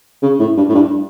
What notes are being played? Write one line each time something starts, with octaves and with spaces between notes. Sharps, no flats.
C#3
A2
G2
A2
G2